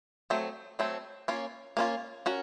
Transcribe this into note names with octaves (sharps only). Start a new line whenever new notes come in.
F#3 A3 C4
F#3 A3 C4
A#3 C#4 F4
A#3 C#4 F4
C#4 F#4 A#4